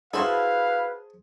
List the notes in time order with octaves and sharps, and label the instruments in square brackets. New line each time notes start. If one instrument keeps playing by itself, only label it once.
[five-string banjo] E4 F#4 [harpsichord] G#4 C5 A5 [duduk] B4 [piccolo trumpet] F5